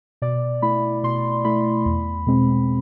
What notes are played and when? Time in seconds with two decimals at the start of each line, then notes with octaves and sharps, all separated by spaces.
0.22 B2 D5
0.62 A3 E4 B5
1.03 B2 C6
1.45 A3 E4 B5
1.86 E2
2.27 B2 G#3 C4